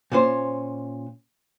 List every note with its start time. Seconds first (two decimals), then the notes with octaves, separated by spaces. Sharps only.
0.12 A#2 C#4 C5